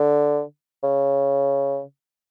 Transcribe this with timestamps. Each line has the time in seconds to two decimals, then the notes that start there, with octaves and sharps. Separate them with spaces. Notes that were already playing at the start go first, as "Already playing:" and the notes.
Already playing: D3
0.84 C#3